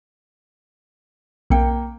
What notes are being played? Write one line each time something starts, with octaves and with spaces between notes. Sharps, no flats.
B1 A#3 G5 C#7